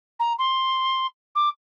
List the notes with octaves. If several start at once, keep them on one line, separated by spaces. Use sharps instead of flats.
A#5
C6
D6